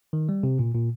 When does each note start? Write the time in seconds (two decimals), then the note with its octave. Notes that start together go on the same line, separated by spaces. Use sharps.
0.13 D#3
0.29 G3
0.43 C3
0.59 A#2
0.75 A#2